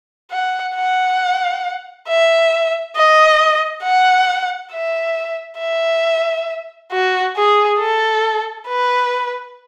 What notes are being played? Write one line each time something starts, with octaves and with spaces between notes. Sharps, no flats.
F#5
F#5
E5
D#5
F#5
E5
E5
F#4
G#4
A4
B4